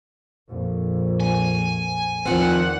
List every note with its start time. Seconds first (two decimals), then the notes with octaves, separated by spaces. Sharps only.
0.49 A#1 F2
1.20 G#5
2.26 E2 D#3 F3 C4 F#5